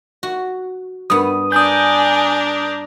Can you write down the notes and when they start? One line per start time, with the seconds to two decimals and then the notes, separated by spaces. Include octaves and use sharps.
0.23 F#4
1.10 G2 B3 D#6
1.52 D4 A#4 G#5 D#6 G6